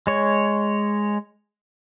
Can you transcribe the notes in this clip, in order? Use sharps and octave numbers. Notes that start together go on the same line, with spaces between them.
G#3 C#5